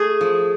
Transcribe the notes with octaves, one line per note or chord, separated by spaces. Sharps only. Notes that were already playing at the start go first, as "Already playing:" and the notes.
Already playing: A3 G#4
F3